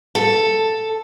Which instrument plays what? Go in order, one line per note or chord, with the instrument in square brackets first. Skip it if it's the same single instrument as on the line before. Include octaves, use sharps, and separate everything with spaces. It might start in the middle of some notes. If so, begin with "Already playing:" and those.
[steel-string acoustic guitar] A4